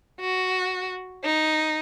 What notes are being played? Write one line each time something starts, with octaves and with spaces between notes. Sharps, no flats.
F#4
D#4